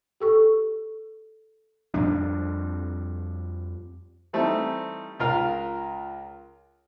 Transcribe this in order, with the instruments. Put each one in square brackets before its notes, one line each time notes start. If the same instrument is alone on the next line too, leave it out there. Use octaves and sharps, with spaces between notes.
[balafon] G4 A4 C#6
[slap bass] F2 F3 G3 D4
[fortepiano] E3 G3 A3 C4 D#4
C#2 F4 A#4 F5 F6